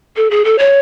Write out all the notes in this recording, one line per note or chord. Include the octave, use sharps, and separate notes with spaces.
A4
G#4
A4
C#5